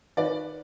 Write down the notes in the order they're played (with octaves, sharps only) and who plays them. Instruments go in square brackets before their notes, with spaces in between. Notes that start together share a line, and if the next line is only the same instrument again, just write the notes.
[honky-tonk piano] D#3 B4 D5